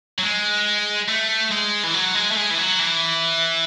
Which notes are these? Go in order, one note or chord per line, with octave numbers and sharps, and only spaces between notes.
F#3
G#3
A3
G#3
E3
F#3
G#3
A3
G#3
E3
F#3
E3